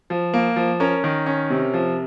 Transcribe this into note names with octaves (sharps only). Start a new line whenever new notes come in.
F3
A#3
F3
C#4 A#4
D#3
C#4
C3
F3